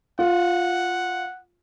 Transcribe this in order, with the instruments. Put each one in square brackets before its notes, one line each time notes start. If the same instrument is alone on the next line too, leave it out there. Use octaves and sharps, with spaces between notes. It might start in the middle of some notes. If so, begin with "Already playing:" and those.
[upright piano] F4 [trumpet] F#5